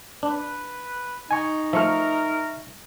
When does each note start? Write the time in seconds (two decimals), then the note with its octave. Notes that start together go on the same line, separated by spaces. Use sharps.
0.23 D4 B4
1.31 D#4 G#5 C#6
1.73 F3 A3 A#4 E5 C#6 F6